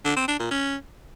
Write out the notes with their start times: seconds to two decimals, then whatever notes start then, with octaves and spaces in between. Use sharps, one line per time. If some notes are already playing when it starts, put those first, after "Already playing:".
0.05 D3
0.16 C4
0.28 D4
0.39 A#2
0.51 C#4